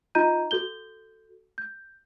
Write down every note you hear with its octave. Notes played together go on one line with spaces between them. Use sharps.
D#4 F4 D#5 A#5 G6 D#7
F#4 A4 G6 G7
G6